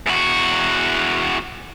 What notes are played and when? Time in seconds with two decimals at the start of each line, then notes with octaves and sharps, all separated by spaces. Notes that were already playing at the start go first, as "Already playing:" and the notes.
0.06 E2 F#4